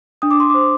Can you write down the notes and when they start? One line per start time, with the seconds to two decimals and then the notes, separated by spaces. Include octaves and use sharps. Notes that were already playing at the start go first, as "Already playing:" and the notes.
0.22 D4 D#6
0.31 D6
0.40 C6
0.50 C5 D6